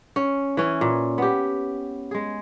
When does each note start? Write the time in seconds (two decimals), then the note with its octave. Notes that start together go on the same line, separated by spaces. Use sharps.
0.16 C#4
0.57 E3 C#4
0.81 A#2
1.18 B3 G4
2.11 G#3 G#4